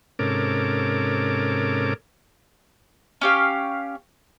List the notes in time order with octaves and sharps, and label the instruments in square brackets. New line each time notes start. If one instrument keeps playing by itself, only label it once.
[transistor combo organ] G#2 C3 C#4 A4 A#4 D6
[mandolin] C#4 G4 F5